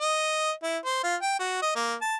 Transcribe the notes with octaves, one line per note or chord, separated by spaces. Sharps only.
D#5
E4
C5
F4
G5
F#4
D#5
A#3
A5